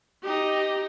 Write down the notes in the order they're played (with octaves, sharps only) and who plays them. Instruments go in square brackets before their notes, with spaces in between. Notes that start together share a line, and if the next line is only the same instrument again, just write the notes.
[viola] D#4 G4